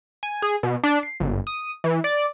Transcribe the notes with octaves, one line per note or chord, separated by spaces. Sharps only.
G#5
G#4
B2
D4
C7
G1
D#6
E3
D5